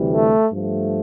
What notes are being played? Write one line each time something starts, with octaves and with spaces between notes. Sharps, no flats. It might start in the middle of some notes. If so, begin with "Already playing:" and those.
Already playing: D2 C3 E3 G3
A3
G2 F3 A3